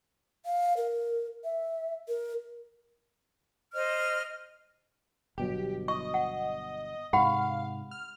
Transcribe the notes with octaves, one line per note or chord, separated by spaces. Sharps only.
F5
A#4
E5
A#4
C5 D#5 F6
G1 B2 F#3 G4
D#5 C#6
F#5
G#2 C3 G4 F5 F#5 B5
F6